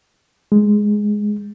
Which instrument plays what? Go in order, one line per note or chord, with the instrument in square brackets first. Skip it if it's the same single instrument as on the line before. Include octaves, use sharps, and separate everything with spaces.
[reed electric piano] G#3